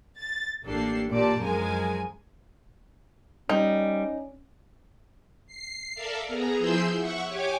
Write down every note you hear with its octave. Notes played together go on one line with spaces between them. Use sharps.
A6
A1 A#3 D4 G4 A4 C7
A#2 G4 D5 A5
F#2 F3 G#3 A#4 G#5
G3 C#4 D#4
C7
A4 A#4 D5 E5 F5
B3 G#4 A#5
F3 E4 G#4 C6 E6 G6
E5 F#5 C#6
G4 C#5 G#5 D6